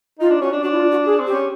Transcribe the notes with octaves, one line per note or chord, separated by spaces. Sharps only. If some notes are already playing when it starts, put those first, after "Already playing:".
D#4 F4
D4
C#4 F#4
D4
D4 F#4
E4
F4
F#4
G#4
C4
G4
C#4